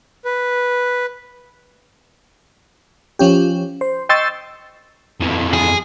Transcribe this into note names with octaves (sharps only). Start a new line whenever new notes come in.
B4
F3 C#4 G4
C5
D#5 G5 C6 C#6 E6 A6
F2 E3
G#4